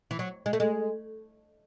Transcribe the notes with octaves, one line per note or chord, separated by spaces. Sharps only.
E3
F#3
G#3
A3
G#3